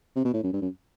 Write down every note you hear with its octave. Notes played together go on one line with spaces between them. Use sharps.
C3
B2
A2
F#2
G2
F#2